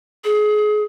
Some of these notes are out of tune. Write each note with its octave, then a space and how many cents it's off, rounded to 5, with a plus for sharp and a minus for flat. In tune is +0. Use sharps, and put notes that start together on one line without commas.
G#4 +25